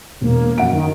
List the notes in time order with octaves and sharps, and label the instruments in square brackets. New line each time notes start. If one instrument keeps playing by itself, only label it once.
[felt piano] E1 [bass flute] A#3
[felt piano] F#2 F#5 D7
[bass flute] D#3 [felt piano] A#4